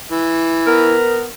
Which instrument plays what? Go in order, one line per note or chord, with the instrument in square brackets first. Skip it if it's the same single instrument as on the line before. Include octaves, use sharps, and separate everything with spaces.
[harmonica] E3
[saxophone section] B3 A#4